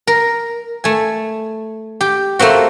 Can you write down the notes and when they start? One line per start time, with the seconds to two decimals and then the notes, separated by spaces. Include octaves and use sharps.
0.07 A#4
0.84 A3 G#5
2.01 G4
2.39 A3 A#3 C4 F#4